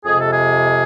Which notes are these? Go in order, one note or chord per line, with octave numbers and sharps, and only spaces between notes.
F2 C3 G#3 G#4
A4
G#4